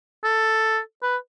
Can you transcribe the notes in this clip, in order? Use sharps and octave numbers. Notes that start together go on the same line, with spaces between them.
A4
B4